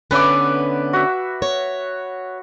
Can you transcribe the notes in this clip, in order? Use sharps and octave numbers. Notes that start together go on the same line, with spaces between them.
D3 B3 C#4 B4 E5 D6
F#4 E5
C#5